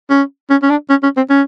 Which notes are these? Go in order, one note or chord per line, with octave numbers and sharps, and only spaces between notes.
C#4
C#4
C#4
D4
C#4
C#4
C4
C#4